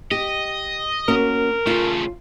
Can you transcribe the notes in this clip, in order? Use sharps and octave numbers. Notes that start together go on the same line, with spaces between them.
G4 D#5
A#3 C#4 F#4 A#4
C#3 A3 F4